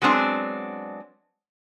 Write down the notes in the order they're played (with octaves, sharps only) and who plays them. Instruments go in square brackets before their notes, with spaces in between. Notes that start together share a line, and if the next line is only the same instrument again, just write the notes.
[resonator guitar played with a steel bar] F#3 G#3 B3 C4 D4